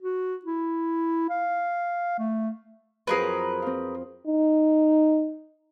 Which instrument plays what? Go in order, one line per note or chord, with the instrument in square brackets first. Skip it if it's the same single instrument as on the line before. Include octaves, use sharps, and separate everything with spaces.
[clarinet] F#4
E4
F5
A3
[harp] F2 F3 F#3 [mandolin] G#4 A#4 B4
[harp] C4 F4
[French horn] D#4